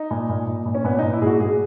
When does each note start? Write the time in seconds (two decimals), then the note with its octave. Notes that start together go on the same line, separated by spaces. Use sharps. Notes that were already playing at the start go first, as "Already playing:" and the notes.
Already playing: D#4
0.11 A#2
0.29 A#2
0.47 A#2
0.66 A#2
0.75 C#4
0.84 A#2 B3
0.99 A#2 D#4
1.13 E4
1.22 A#2 F#4 G#4
1.40 A#2 G#4